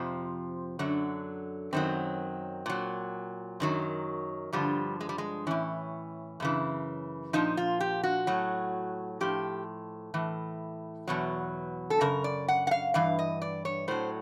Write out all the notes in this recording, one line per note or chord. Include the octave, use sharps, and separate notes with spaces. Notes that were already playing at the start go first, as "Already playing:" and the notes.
Already playing: F2 C3 F3
F#2 D3 F#3
F#2 D#3 F#3 C4
A#2 F#3
F#2 D#3 F#3
G2 D3 F3 G3
G#3
G3
G#3
A2 E3 C#4
F#2 C#3 E3
A#2 F3 D#4
F4
G4
F#4
A2 F#3
A2 F3 G4
A2 E3
E2 B2 F#3
A4
F#2 C#3 A#4
D5
F#5
F#5
F5
G2 E3 F5
D#5
D5
C#5
A2 F#3 C5